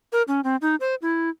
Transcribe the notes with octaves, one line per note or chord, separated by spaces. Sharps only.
A#4
C#4
C4
D#4
C5
E4